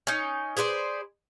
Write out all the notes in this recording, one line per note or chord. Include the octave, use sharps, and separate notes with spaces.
C#4 D#4
G#4 B4 C5 D5